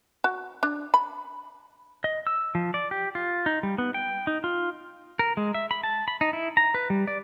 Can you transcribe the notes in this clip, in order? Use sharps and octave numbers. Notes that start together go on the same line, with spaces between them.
F#4
D4
B5
D#5
E6
F3
D5
G4
F4
D#4
G3
B3
G5
D#4
F4
A#4
G#3
E5
B5
A5
B5
D#4
E4
A#5
B4
G3
D5